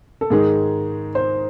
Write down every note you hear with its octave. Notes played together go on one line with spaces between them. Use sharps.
A4
G#2 D#3 G#3 D#4 G#4
C5